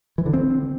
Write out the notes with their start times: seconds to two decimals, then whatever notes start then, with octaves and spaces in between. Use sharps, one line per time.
0.18 E3
0.26 D3
0.34 C4